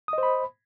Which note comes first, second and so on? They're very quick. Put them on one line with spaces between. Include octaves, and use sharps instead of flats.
D#6 D#5 C5 B5